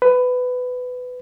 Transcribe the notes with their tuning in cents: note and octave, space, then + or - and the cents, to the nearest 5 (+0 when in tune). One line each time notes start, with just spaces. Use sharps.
B4 +20